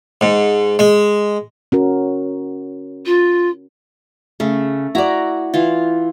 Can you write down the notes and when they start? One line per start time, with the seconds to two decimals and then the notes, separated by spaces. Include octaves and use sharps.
0.21 G#2
0.79 G#3
1.72 C#4 F#4 A#4
3.05 F4
4.40 C#3 A3
4.95 E4 F#4 D5 A#5
5.54 E3 F4